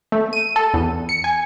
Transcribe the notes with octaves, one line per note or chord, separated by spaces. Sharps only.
A3
D#7
A4
E2
C#7
G#5